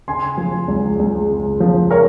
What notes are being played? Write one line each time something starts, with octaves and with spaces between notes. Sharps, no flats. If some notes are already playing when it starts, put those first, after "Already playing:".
C#3 G#5 C6
F3
C#2
C#2
C#3
F3
A#4 C#5